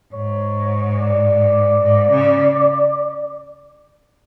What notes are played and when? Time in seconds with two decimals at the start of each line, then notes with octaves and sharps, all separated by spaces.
0.13 G#2 C#5
0.98 D5
1.83 G#2
2.11 C#3